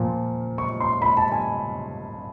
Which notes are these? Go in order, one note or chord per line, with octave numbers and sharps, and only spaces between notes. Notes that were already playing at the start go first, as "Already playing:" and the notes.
Already playing: A#2 F3
C#6
C6
B5
A5
G#5